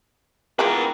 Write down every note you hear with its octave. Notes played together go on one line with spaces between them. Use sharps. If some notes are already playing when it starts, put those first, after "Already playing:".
E3 F3 G#3 A#3 B3 A#4 B4 G5